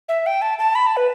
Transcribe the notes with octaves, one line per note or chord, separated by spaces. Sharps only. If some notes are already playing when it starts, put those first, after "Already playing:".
E5
G5
A5
A5
B5
A5
B4